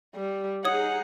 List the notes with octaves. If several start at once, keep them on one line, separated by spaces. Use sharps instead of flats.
G3
D#4 G#4 C#5 F#5 D#6